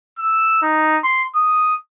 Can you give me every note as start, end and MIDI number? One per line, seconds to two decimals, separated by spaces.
0.18 0.60 88
0.62 0.98 63
1.03 1.23 84
1.35 1.75 87